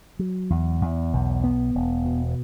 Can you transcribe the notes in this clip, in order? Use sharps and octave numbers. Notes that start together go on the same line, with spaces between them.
F#3
E2
E2
B1
B3
E1
B2